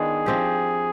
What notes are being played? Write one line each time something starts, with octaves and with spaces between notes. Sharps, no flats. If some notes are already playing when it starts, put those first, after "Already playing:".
Already playing: D#3 B3 D4 F4 G#4
F3 C4 G4